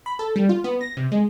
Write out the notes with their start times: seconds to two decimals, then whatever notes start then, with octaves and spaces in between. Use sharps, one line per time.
0.06 B5
0.19 A4
0.36 G3
0.49 F4
0.64 B3
0.81 A#6
0.97 C3
1.12 G#3